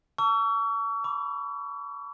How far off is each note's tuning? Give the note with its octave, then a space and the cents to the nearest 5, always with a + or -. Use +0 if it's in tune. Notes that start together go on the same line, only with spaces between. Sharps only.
A5 +30 C#6 +40 E6 +25
B5 +0 D6 +0